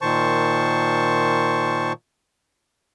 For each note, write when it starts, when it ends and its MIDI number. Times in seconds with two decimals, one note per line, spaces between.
0.02 1.93 46
0.02 1.93 51
0.02 1.93 72
0.02 1.93 81
0.02 1.93 85